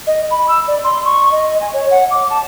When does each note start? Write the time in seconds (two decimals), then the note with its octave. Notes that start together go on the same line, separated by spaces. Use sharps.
0.07 D#5
0.31 B5
0.48 E6
0.68 D5
0.84 C6
1.05 C#6
1.31 D#5
1.61 G#5
1.73 C#5
1.91 F#5
2.11 D6
2.30 A5